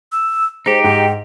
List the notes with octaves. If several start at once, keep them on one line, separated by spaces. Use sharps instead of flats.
E6
G#3 D#4 G4 C5
G#2 G5